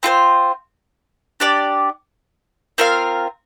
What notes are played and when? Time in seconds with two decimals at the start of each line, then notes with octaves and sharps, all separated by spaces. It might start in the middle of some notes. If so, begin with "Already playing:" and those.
0.03 C4 F4 A4 C5
1.40 D4 G4 D5
2.78 C4 F4 A#4 F5